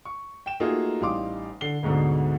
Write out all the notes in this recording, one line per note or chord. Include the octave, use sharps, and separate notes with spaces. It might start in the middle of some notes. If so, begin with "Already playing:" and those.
C#6
G5 E7
A3 A#3 D#4 F4 F#4 G#4
A1 G3 D#4 F5 C6 D6
D3 C7 G7
D2 G#2 B2 D3